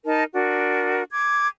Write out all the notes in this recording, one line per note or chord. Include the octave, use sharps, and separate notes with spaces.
D#4 A#4 A5
D4 F#4 A#4
D6 G#6